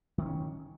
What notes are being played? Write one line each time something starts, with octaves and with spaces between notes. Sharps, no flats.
D#3 C4 C#4